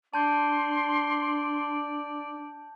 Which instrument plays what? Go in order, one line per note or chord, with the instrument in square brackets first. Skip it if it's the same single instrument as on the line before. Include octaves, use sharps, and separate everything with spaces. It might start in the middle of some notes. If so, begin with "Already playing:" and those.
[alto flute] D4 [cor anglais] D5 [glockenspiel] A5 G6 [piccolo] C6